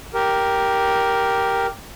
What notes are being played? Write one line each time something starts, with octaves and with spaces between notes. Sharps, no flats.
G4 A#4